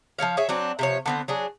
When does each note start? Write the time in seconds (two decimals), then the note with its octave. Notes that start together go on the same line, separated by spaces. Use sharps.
0.19 F3 A3 C#5 F5
0.37 G#4 C#5 E5
0.49 F#3 C4 D4
0.79 C3 F3 C#5
1.06 D3 B3 C4
1.28 F#3 D4 G#4